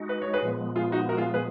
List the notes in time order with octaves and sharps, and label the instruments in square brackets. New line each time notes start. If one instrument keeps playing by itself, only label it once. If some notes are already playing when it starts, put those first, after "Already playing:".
Already playing: [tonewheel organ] G#3 D#4 F#4
[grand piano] B4
C#5
G#4 B4
[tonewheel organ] A#2 F3 G#3 B3
[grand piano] F4 G#4
D#4 F#4
F#4 A#4
F4 G#4
G#4 B4